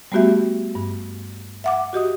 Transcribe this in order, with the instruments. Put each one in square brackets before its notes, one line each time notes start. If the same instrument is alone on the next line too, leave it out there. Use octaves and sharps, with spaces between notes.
[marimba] G3 A3 B3 F#4 G4 E5
G2
E5 F#5 D6
F#4 G4 D#5 D#6